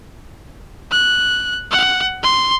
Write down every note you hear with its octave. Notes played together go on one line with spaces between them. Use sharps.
F#6
F#5
C6